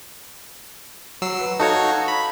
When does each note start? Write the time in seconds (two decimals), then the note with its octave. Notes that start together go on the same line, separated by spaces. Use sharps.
1.22 F#3 E6 C7
1.39 B4
1.59 D#4 F#4 A4 C#5 F5
2.08 B5